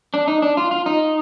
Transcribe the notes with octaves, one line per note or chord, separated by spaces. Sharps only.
D4
D#4
D4
F4
F4
D#4